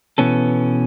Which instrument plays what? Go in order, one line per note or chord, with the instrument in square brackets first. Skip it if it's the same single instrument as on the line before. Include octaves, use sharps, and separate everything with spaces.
[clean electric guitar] B2 E3 B3 C#4 A4